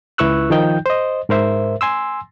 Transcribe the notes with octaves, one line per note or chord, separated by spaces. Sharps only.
C#2 E4 B4 C#6 E6 F#6
D#3 F3 D#4 G5 G6
C5 D#5
G#2 A#4 C5 E5
G#5 C6 E6